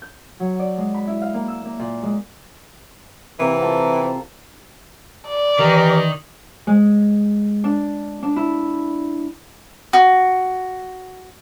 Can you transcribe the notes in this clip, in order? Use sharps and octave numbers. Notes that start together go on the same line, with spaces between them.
G6
F#3
D5
G#3
B5
E4
F5
A#3
E6
A#3
A#2
G#3
C3 E3 A#3
F4 A4 G5
C5
D5
D#3 E3 G4 A#4
G#3
D4
D4
E4
F#4